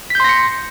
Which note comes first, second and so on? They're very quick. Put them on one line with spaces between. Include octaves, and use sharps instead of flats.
B6 G6 C6 A#6 C#7